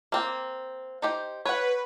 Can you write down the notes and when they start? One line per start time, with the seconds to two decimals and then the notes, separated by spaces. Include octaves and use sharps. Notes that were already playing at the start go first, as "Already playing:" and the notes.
0.12 A#3 C4
1.02 D#4 G4 C5
1.45 B4 C#5 F#5